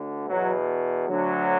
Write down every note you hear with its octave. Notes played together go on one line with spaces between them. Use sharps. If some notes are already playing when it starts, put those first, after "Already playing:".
Already playing: D2 D3
E2 B2 F#3
D2 D3 F#3